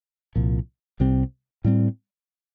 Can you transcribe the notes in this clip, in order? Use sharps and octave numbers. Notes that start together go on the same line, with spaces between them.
C2 A#2 F3
C2 C3 G3 C4
A2 G3 C4